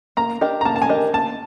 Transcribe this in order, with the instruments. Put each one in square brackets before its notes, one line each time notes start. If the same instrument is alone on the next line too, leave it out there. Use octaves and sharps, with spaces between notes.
[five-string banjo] A#3 [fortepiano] A#5
[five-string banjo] D4 G4 A#4 D#5
[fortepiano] A#5
[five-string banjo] A#3 [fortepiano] A5
[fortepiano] A5
G#5
[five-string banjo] D4 G4 A#4 D#5
[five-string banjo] A#3 [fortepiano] A5